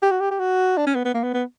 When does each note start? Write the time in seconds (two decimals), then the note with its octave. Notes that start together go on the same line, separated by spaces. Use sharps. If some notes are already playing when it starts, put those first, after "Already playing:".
0.02 G4
0.11 F#4
0.20 G4
0.31 G4
0.39 F#4
0.77 D4
0.87 C#4
0.95 B3
1.05 B3
1.14 A#3
1.23 B3
1.34 B3